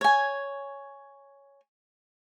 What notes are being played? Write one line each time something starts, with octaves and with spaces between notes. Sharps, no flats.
C#5 G#5